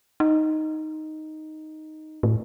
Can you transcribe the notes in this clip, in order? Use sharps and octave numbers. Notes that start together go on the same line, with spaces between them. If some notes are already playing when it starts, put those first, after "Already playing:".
D#4
A2